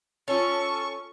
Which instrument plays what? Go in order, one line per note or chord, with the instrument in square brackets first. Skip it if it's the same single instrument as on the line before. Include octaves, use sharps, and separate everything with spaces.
[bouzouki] C#4 [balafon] F4 C#5 [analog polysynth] A4 [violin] C#6